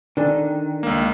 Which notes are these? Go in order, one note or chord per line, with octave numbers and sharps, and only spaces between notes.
D#3 D4 A4 G#5
C#2 A#3